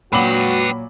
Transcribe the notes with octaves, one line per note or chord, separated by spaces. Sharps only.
A#2 F#3 F#4 B4 G5 B5 D6 F#7